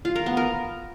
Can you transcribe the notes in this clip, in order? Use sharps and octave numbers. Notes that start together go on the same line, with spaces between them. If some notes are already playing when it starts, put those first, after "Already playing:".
F4
A#4
B3
A#4